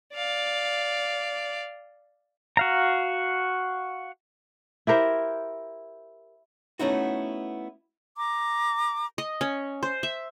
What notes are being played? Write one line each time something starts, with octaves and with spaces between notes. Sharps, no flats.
D5 F5
F#4 F5 A#5
E4 G4 A#4 C5
A3 B3 C#4 D#4 E4 F#4
A#5 D6
D#5
C#4
C5
E5